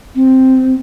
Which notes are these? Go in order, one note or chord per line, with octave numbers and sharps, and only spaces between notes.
C4